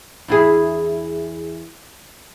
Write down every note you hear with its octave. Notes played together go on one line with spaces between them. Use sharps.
E2 E4 G#4